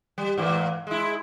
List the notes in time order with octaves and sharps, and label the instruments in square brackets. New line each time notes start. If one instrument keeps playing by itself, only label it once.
[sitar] G3
G#2 E3 A#3
G#3 E4